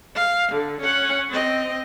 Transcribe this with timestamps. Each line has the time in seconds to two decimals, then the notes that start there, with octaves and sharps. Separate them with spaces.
0.16 F5
0.52 D3
0.81 C#4 F#5
1.31 C4 D#5